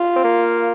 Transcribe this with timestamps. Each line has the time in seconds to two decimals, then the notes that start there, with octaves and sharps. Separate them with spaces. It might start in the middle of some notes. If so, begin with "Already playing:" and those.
Already playing: F4
0.16 C4
0.24 A#3